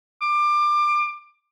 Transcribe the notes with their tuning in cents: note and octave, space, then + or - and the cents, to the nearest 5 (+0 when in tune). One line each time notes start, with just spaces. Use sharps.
D6 +25